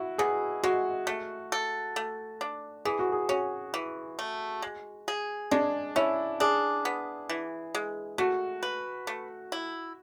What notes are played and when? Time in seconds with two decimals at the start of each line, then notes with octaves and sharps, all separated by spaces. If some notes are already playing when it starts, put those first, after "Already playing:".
Already playing: E4 F#4
0.18 B2 G#4
0.63 G#3 F#4
1.07 A3
1.52 A4
1.96 A3
2.41 D4
2.85 E3 G#4
2.99 F#4
3.12 G#4
3.29 C#4 F#4
3.74 E3
4.19 A3
4.62 G#3
5.08 G#4
5.51 G#3 D4
5.96 C#4 E4
6.40 D4 G#4
6.85 B3
7.29 E3
7.75 G#3
8.18 A3 F#4
8.63 B4
9.07 A3
9.52 E4